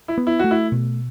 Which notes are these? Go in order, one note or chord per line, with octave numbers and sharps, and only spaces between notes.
E4
B3
E4
A3 F#4
E4
B2